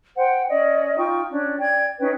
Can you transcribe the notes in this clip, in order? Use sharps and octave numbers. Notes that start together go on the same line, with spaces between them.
C5 F#5 G5
C#4 D5 D#5
D#4 F4 G5 C#6
C#4 D4
D5 G5 G#6
C#4 D#4 B4 G5